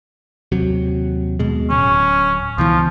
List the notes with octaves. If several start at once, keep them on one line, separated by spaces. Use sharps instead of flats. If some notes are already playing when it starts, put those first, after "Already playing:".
D#2 C3 F#3
D#2 B2 G#3
D1 C#4
C#2 B2 E3 F3